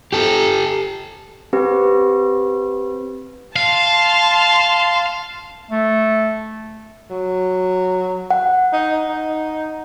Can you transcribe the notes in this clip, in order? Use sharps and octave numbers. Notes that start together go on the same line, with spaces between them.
G4 A4
C4 G4 B4
F5 A5 C6
A3
F#3
F#5
D#4
D#4